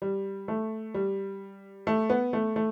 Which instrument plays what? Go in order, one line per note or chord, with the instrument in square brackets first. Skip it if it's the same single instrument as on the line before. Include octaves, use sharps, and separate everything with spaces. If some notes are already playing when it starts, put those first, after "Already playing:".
[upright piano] G3
A3
G3
A3
B3
A3
A3